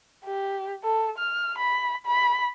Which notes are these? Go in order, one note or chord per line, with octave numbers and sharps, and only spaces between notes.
G4
A4
F6
B5
B5